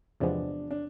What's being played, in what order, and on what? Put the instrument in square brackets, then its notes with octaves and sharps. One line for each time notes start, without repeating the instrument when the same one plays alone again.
[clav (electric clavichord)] E2 C3 F3 G#3 B3 [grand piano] D4
[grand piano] D4